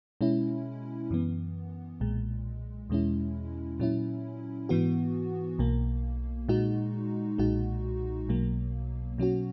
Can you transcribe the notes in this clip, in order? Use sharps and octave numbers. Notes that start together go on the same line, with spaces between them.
B2 G#3 C#4 E4
F#2 E3 B3
B1 A#2 G#3
E2 B2 G#3 C#4 E4
A#2 F#3 C#4 E4
G#2 E3 B3 F#4
B1 B2 A#3
A#2 G#3 D#4 F#4
B1 A#2 G#3 D#4 F#4
B1 B2 F#3 A#3
B2 F#3 C#4 F#4